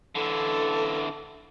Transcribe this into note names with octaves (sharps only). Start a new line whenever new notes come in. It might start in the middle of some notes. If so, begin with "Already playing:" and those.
D3 E3 A4